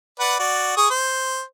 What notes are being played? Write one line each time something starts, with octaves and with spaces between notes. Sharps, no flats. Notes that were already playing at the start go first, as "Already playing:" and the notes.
B4 D5 F#5
F#4 D5
G#4 C#6 D#6
C5